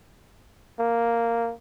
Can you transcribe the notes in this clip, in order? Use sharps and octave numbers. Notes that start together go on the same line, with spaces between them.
A#3